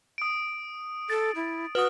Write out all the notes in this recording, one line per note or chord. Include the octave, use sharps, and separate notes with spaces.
D#6 D7
A4 A6
E4
F#4 B4 D#6 F6